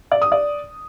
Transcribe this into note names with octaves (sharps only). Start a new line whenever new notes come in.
D5
D#6
D5